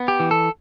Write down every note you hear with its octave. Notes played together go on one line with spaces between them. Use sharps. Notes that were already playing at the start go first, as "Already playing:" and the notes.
Already playing: B3
G4
E3
A4